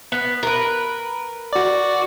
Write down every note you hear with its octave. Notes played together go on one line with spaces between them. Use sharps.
B3
A#4 B4
F#4 D5